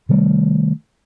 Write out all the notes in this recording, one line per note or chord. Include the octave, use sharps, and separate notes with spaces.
C3 D#3 G3 A3